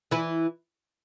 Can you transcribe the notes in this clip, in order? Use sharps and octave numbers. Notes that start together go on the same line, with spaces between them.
E3 E4